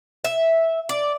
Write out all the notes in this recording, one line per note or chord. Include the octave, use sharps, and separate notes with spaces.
E5
D5